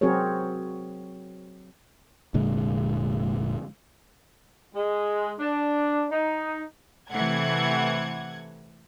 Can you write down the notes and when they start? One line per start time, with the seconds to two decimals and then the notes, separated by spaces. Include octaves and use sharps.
0.01 F#3 C4 F#4 G#4 A#4 C#5
2.34 F1 A#2 D3 G#3
4.75 G#3
5.38 D4
6.11 D#4
7.11 C3 E3 A3 F#5 G#6